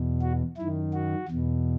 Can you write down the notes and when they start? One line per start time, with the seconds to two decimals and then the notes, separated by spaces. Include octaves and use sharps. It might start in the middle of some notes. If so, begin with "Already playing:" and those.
Already playing: E2 B2
0.21 F#4
0.57 F#2 D#3 E4
0.93 F#4
1.28 E2 B2